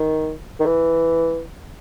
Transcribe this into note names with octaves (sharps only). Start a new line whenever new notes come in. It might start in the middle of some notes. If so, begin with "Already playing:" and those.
Already playing: D#3
D#3
E3